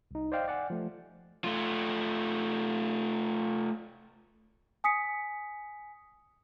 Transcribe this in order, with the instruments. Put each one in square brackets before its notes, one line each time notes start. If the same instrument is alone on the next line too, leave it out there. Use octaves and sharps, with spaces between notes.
[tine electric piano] C2 D#4
C5 D5 D#5 F5 G5
D5 F#5 G#5
F3 A3
[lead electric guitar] A3 F4
[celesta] G#5 D#6 B6 C#7